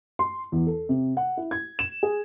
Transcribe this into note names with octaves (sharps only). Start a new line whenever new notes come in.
C6
E2
A4
C3
F#5
E4
G#6
E7
G#4